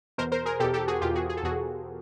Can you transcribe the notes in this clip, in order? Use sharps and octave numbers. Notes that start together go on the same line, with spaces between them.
E2 B2 A#4 C5
A#4 C5
G#4 A#4
E2 B2 G4 A4
G4 A4
F#4 G#4
E2 B2 F4 G4
F#4 G#4
G#4
A4
E2 B2 F#4 G#4